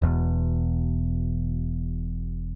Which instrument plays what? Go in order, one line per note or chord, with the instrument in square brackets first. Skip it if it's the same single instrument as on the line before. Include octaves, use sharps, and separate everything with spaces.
[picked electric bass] E1 E2 B2